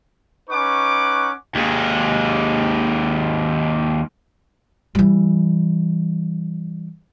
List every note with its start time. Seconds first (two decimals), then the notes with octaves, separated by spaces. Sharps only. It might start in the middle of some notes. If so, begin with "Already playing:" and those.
0.50 C#4 D#4 B4 F#5 C#6 D6
1.55 D#2 G#3
4.95 E3 G3